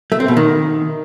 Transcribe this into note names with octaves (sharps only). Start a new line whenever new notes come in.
A3
C4
B2
D#3